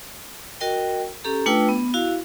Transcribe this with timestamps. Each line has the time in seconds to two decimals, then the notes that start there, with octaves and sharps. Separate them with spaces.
0.61 F#4 A#4 D#5 G5
1.24 C#4 G4 A4 A#5
1.46 A3 D4 F4 B4 G5 E6
1.69 B3
1.94 E4 F#4 F5